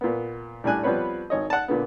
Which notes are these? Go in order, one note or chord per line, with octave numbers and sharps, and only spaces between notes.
A#2 B3
A2 G3 D4 G#5 F#6
F3 G3 B3 C4 B4 C#5
G#1 C#5 D#5
F#5 A5
A#2 D3 B3